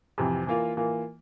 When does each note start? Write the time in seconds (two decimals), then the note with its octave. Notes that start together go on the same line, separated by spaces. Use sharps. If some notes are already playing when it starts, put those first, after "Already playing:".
0.18 F2 C3 E3
0.47 E3 A#3 F4
0.77 E3 A#3 F4